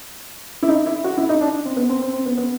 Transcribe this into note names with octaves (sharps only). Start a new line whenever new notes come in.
E4
D#4
E4
F#4
E4
D#4
D4
C4
B3
C4
C4
C4
B3
B3